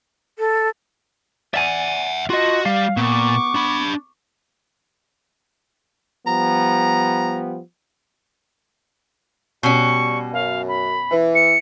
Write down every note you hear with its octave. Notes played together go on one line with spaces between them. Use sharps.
A4
D5 E5 F#5 G#5
F4 F#4 D#5
G3 F5
A#2 B3 C#6 D6
D4 B5
F3 G3 B3 A#5
B2 G3 C#4 C#6
F#2 F5
B5
E3
C#7